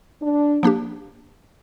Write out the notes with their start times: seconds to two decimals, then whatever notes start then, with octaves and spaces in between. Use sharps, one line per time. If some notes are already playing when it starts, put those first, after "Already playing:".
0.22 D4
0.63 F3 A#3 D4 G4